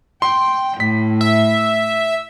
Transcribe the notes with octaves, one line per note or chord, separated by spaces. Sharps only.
G5 C6
A2 B6
E5